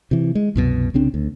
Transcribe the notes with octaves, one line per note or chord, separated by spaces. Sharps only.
C3 E3
G#3
C2 F#2 B2
C2 C#3 C4 D4
D2